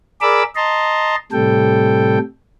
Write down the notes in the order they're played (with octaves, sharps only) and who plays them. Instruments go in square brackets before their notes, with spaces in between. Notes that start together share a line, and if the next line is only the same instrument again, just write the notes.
[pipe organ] G#4 A#4 D5 B5 D6 E6
D#5 A5 A#5 C6
A2 C3 G3 A4 G5